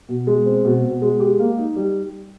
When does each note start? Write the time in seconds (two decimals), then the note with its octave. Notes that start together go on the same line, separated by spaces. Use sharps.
0.09 B2
0.27 G#3
0.46 C4
0.65 B2
0.83 B2
1.02 G#3
1.20 G4
1.39 A#3
1.58 D#4
1.76 G3